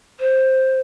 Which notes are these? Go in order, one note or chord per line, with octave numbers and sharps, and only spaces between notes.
C5